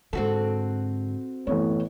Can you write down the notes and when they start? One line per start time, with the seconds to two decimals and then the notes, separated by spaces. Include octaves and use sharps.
0.13 G#2 D3 C4 F#4 A4
1.47 A1 F#2 A2 B3 C#5